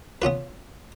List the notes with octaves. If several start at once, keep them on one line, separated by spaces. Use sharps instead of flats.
B3 C#4 F4 B4